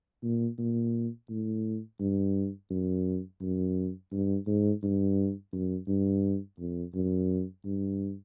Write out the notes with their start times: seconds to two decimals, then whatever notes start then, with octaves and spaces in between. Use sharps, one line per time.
0.23 A#2
0.58 A#2
1.29 A2
2.00 G2
2.70 F#2
3.41 F#2
4.12 G2
4.47 G#2
4.82 G2
5.52 F#2
5.88 G2
6.59 F2
6.94 F#2
7.65 G2